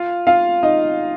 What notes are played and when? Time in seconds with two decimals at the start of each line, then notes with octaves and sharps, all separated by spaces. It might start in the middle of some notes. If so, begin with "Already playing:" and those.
Already playing: F4 F5
0.27 F4 F5
0.63 D#4 D#5